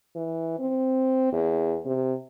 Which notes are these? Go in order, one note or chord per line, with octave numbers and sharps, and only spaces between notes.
E3
C4
E2
C3